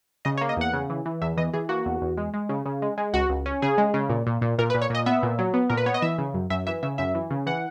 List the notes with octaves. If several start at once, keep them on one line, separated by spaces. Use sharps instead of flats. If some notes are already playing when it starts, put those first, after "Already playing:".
C#3 D#5
C#5
A#3
D#5
E2 F#5
C#3
E3
E3
E2 E5
E3 D#5
E3 G#4
A#3 F#4
E2
E2
G#3
G#3
C#3
C#3
G#3
G#3
C#2 F#4
C#2
C#4
C#3 G#4
G#3
C#3
A#2
A#2
A#2
A#2 A#4
B4
A#2
C#5
A#2 D#5
B3 E5
A#2
F#3
B3
A#2 A#4
B4
B3 C#5
D#5
E3 E5
C#3
F#2
F#2 E5
E3 E5
C#3 E5
F#2 E5
E3
C#3
E3 F#5